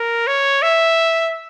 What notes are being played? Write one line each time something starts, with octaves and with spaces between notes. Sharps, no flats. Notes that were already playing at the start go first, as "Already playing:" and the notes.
Already playing: A#4
C#5
E5